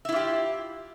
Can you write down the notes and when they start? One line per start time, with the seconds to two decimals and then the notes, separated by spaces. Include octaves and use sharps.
0.05 E5
0.09 E4
0.12 F4
0.16 G4